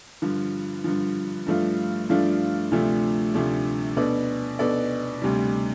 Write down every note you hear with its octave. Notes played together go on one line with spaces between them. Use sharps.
G2 D3 F3
G2 D3 F3
G2 F3 A3 D4 F4
G2 F3 A3 D4 F4
D2 C3 F3 A3 D4
D2 C3 F3 A3 D4
B2 B3 D4 A4 D5
B2 B3 D4 A4 D5
D2 C3 G3